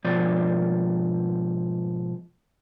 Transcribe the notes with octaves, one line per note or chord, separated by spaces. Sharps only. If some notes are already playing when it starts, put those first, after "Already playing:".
G#2 B2 F3 D5